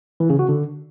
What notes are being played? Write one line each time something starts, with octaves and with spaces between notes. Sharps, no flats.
E3
C#3
F#4
D3